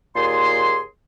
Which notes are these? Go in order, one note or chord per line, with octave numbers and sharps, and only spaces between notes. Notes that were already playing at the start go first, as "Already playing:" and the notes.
D#2 A#2 G#4 C6